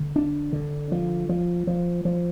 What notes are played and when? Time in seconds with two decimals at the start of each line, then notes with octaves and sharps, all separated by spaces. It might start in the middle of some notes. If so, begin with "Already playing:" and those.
Already playing: D3
0.16 D4
0.53 D3
0.92 F3
1.29 F3
1.67 F3
2.05 F3